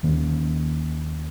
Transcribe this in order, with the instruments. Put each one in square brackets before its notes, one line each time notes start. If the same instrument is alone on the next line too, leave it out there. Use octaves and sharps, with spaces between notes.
[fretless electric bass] D#2 D#3 A#3 C#4